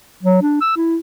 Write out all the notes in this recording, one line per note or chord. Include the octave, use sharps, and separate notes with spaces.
F#3
D4
E6
E4